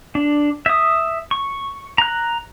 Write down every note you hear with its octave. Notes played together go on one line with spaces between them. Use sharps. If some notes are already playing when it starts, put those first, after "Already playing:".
D4
E5 D#6
C#6
A#5 F#6